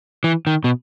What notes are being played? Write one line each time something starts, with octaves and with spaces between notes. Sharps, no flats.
E3
D#3
B2